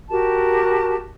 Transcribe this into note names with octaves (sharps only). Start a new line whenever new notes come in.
F#4 G4 A#4 A5